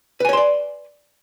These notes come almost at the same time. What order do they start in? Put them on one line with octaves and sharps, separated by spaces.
B4 G#5 C#5 C6 D5